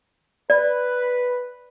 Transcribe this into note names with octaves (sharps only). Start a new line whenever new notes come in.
B4 D5